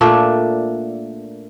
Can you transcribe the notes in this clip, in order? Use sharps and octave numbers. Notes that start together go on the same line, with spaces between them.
A#2 A3 D4 E5